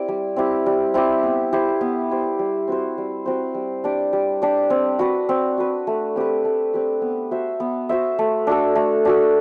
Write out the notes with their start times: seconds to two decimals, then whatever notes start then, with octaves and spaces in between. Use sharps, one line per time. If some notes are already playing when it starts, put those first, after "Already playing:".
Already playing: C4 E4 G4 D5
0.08 G3
0.36 C4 E4 G4
0.66 G3
0.94 C4 E4 G4
1.23 B3
1.53 E4 G4 C5
1.81 B3
2.10 E4 G4 C5
2.39 G3
2.68 C4 F#4 C5
2.98 G3
3.26 C4 F#4 C5
3.54 G3
3.84 D4 G4 D5
4.13 G3
4.42 D4 G4 D5
4.70 C4
4.99 F#4 B4
5.29 C4
5.58 F#4 B4
5.87 A3
6.16 C4 G4 B4
6.45 A3
6.74 C4 G4 B4
7.02 B3
7.31 F#4 C5 E5
7.60 B3
7.89 F#4 C5 E5
8.19 A3
8.47 D4 F#4 A4
8.75 A3
9.05 D4 F#4 A4